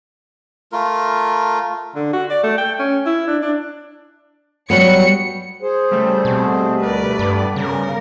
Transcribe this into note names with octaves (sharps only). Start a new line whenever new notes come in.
A3 F4 A#4
D3
F#4
D5
A3
G5
C#4
E4
D4
D4
F#3 G3 B3 C#7
G#4 C5
C#3 G3 A3
B2 C4
D2 A#4 B4 D5
G2 B3
C#3 G3 A#4